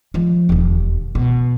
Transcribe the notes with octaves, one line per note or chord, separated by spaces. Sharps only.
F3 G#3
E1 D#2
B2